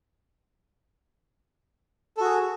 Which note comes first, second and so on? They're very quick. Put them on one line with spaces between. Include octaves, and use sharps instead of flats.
A4 F#4 G#4